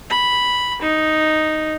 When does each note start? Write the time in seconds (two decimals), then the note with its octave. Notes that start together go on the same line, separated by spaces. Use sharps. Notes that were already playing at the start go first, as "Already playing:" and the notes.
0.10 B5
0.82 D#4